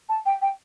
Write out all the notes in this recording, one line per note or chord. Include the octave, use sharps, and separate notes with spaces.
A5
G5
G5